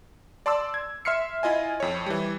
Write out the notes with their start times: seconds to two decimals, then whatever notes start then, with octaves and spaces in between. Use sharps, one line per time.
0.46 D5 A5 C6 D6 E6
0.74 G#6
1.05 E5 C6 F6 C7 C#7
1.43 E4 F4 D#5 G#5
1.80 F2 C#5
2.06 E3 G3